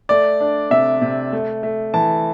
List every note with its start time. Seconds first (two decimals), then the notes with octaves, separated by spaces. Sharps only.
0.09 A3 D5
0.40 D4
0.71 C3 E5
1.02 C3
1.32 A3
1.63 A3
1.94 E3 A5